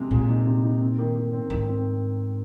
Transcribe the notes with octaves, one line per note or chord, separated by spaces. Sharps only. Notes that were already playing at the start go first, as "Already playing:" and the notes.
Already playing: C3 G#3 G#4
A#2 G#4
D#4
C3
D#4
C4
D#3
D#3
C4
G#2 D#3
C4